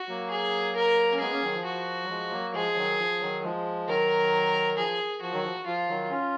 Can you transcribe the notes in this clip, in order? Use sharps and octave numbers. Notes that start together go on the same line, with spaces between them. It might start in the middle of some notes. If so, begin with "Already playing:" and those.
Already playing: F#4
F#3 A#3
G#4
A#4
C#4
G#3 B3 G#4
A#3 C#4
D#3 F#3
F3
F#4
F#3
F3 G#3
F#3 A#3
F3 G#3 G#4
D#3 F#3
F3
D#3 F#3
F3 G#3
D#3 F#3 A#4
F3 G#4
F3 F#4
D#3 F#3
F3
F3 F4
D#3 F#3
C#4 F4